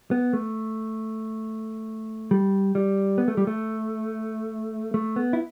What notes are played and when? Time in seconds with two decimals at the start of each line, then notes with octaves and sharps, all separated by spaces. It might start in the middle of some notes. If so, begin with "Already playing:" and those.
0.11 B3
0.33 A3
2.31 G3
2.75 G3
3.18 B3
3.28 A3
3.37 G3
3.47 A3
4.94 A3
5.16 B3
5.33 E4